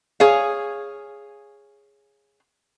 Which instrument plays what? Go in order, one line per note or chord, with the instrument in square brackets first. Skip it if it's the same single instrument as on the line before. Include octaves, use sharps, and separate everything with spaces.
[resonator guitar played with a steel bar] G#4 C#5 F5